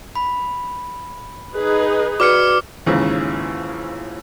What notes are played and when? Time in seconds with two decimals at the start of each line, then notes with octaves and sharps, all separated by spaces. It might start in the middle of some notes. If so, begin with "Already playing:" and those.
0.15 B5
1.55 D#4 G#4 B4
2.20 F#4 B4 D5 D6 F6 C#7
2.86 D#2 G#2 C#3 E3 F3